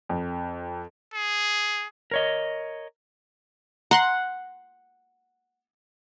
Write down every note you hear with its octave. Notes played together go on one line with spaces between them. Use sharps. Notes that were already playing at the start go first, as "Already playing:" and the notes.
F2
G#4
A#4 C#5 D#5
F#5 A#5 C6 F#6